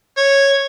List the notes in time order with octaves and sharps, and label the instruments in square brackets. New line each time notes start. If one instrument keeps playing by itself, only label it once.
[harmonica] C#5